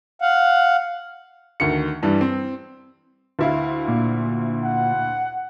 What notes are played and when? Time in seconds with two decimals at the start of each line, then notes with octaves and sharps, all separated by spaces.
0.22 F5 F#5
1.60 D2 D#3 C#7
2.02 G2 E3 G3
2.21 C4
3.39 D2 E4 F5
3.88 A#2
4.64 F#5